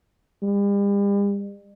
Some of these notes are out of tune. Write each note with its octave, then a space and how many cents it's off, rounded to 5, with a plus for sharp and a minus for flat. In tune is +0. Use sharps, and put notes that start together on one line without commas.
G3 +45